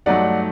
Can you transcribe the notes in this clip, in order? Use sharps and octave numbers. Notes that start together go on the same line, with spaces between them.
G2 F#3 A3 D#4 D5 F#5